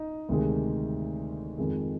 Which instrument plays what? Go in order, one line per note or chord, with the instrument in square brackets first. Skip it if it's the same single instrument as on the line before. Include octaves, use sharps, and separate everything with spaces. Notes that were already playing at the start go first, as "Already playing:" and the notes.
Already playing: [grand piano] D#4
D2 C3 D#3 G#3
F2 D#3 G#3